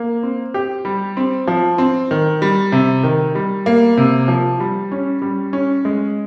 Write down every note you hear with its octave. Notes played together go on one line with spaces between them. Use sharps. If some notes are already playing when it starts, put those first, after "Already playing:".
Already playing: A#3
C4
G4
G3
C4
F3
C4
D#3
G3
C3
D#3
G3
A#3
C3
F3
G3
C#4
G3
C#4
G#3